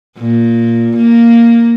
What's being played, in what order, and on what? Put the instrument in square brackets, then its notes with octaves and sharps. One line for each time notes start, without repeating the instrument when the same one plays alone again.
[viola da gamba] A#2
A#3